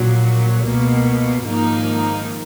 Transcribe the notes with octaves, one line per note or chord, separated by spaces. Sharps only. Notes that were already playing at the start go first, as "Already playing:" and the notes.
Already playing: A#1 A#2 F#3
C#2 B2 A#3
G#1 G#2 F3 A#3 D#4